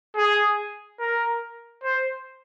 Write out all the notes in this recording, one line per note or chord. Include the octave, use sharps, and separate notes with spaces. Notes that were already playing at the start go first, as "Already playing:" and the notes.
G#4
A#4
C5